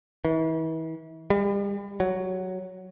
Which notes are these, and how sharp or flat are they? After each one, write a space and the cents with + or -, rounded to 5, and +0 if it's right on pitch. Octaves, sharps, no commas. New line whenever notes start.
E3 -40
G3 +40
F#3 +5